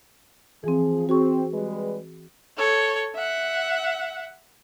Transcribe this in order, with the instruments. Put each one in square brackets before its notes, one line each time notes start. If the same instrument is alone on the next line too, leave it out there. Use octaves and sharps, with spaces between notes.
[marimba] E3 C4 [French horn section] F3 G#4
[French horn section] C4 [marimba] F#4 G#4 C#6
[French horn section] G3 G#3 B4
[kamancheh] A4 C#5
E5 F#5